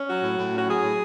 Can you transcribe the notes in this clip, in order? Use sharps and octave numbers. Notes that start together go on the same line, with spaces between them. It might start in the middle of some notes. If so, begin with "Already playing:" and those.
Already playing: C#4
F#3 F#4
A2
A2
C#4 F#4
F#3 G#4
A2